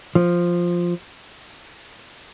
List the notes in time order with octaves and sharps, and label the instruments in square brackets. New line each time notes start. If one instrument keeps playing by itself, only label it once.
[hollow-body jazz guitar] F3